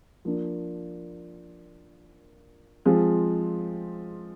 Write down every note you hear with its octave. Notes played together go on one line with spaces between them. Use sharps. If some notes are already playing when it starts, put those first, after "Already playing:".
F3 A#3 D4
F3 G#3 C4 F4 G#4